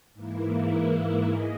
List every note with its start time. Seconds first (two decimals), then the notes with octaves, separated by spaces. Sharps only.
0.14 G#2 E3 A#3 E4
1.26 G#4 D#5